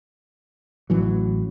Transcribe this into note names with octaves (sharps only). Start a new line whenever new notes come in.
A1 E3 F#3